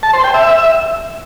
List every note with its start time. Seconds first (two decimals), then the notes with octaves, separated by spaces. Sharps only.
0.03 A5
0.13 C5
0.24 G5
0.34 E5